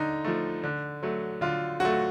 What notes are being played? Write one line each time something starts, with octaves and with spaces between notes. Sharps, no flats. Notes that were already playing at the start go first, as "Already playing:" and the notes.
Already playing: D3 D#4
F3 A3
D3
F#3 A3
D3 F4
F#3 A3 F#4